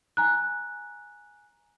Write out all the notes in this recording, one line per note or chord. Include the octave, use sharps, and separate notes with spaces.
G#5 A#5 F#6